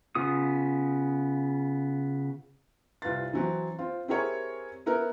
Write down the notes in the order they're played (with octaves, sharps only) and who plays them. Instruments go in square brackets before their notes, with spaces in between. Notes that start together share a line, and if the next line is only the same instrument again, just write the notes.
[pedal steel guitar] C#3 B3 F4 D#6
[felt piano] C2 F4 B4 A6
E3 F#3 C4
C4 F4
C4 E4 G4 G#4 A#4 C#5
B3 E4 A#4 B4